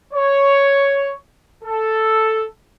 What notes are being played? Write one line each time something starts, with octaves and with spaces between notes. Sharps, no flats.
C#5
A4